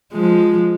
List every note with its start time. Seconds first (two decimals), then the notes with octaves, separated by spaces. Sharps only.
0.13 F3 G#3